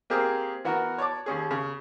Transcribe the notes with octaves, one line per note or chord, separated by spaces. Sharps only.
A#3 C4 G4 G#4 A#4
E3 B3 F#4 A#4
C#5 D5 A5 D6
D#2 C#4 G#4
C#3